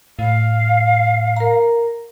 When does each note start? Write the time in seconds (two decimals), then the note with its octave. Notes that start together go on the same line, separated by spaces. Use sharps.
0.19 A2 F5
1.36 A#4 A#5